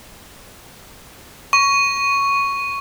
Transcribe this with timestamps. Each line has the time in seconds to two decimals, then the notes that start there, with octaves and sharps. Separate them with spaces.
1.53 C#6